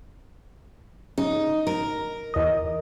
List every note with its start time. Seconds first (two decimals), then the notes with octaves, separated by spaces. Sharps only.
1.18 C#3 D#4
1.67 A#4
2.34 E2 D#5